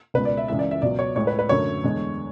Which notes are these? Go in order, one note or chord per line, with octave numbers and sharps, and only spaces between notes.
C#2 B2 G#3 B4
D5
E5
C#2 C#3 E3 G#3 E5
D5
E5
C#2 B2 F#3 D5
C#5
A2 G#3 C#5
B4
B4
F#2 D3 F#3 A3 C#5
E2 D3 G#3